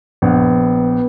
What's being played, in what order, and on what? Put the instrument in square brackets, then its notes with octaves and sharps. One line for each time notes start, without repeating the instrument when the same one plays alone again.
[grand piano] A#1 [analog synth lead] B3